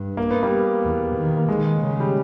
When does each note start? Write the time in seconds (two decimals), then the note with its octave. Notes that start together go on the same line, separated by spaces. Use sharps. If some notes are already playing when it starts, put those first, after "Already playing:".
Already playing: G2
0.17 A#3
0.31 B3
0.43 G3 A#3
0.83 E2
1.15 D#3
1.37 A#3
1.48 D#3 G#3
1.81 C#3
2.00 G3